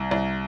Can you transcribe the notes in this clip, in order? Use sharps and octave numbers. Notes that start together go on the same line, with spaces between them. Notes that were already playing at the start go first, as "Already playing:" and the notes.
Already playing: C2
C2